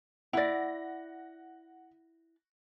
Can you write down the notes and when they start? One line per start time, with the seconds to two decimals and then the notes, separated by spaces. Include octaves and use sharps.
0.33 E4 D5 F#5 A#6